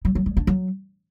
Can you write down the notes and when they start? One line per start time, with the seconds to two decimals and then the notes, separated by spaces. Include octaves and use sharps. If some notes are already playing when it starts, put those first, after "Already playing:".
0.05 F#3
0.15 F#3
0.26 G#3
0.37 D4
0.47 F#3